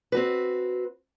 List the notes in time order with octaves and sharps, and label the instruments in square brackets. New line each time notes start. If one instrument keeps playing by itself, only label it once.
[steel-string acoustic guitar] C4 F#4 B4